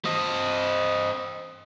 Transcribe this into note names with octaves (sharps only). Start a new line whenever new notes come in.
C4 D#5